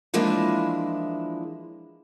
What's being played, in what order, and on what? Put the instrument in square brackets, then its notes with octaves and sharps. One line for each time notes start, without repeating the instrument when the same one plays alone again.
[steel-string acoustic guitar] E3 F3 G#3 A#3 D4 E4